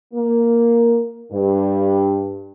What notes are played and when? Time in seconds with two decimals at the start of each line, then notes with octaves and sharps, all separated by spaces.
0.13 A#3
1.32 G2